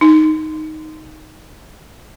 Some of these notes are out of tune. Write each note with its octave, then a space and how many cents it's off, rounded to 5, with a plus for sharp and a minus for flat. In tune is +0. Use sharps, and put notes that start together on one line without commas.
D#4 +0